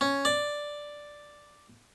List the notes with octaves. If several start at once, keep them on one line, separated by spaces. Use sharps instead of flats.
C#4
D5